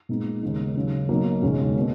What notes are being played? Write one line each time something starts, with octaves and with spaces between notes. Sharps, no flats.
A#2 G#3 B3 D#4
D#2 C#3 G#3 D#4
D#2 C#3 F#3
B1 B2 F#3 A#3
E1 D#2 C#3 G#3 C#4
B2 A#3